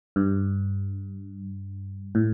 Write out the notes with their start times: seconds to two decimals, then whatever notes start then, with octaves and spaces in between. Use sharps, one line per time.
0.16 G2
2.15 A2